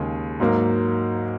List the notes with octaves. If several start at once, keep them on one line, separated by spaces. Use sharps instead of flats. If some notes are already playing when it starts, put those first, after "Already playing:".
Already playing: D#2 C#3 G#3
G#2 F#3 A#3